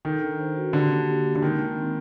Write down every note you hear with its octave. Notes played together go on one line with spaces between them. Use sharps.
D#3 A4
D4
C5
F#4
D3 G4
A#3
G4
A#3
D3
D#3 G#3
G#3
C4